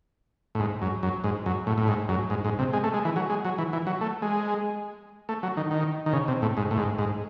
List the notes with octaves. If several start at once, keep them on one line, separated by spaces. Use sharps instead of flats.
A2
G#2
F#2
F#2
G#2
F#2
A2
A2
G#2
F#2
G#2
G#2
C3
G#3
A3
G#3
E3
F#3
G#3
F#3
E3
E3
F#3
A3
G#3
A3
F#3
D#3
D#3
D#3
C#3
C3
A2
G#2
A2
G#2
G#2